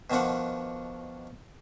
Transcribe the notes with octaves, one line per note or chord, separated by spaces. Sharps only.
B2 D#3 F3 D4 F#5